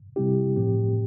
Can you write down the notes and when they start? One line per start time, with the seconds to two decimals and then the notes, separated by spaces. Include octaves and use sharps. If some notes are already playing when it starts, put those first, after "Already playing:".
0.16 C3 G3 C4 E4 G4
0.56 A2 F3 C4 G4